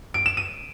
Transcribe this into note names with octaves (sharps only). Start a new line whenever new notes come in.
D7
E7
D#7